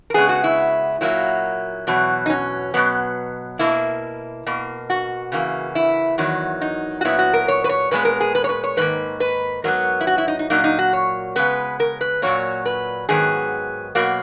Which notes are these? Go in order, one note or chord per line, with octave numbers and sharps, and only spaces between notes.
A#4
C#3 G#3 B3 G#4
F#4
E4
A#2 F#3 A#3 E4
E2 B2 F#3
D#4
C#4
B2 F#3 B3
B2 A#3 E4
B2 A#3
F#4
C#3 E3 A#3
E4
E2 D#3 F#3
D#4
F#4
A#2 F#3 B3 E4
F#4
A#4
C#5
B4
C#5
A#2 G#3 B3 B4
A#4
G#4
B4
C#5
B4
C#5
G#2 D#3 A#3 B4
B4
G#2 F#3 B3 A#4
E4
F#4
E4
D#4
D#4
A#2 F#3 A#3 D#4
D#4
F#4
C#5
C#3 G#3 B3 B4
A#4
B4
A#2 F#3 A#3 C#5
B4
G#2 D#3 F#3 B3 G#4
B2 F#3 A#3 F#4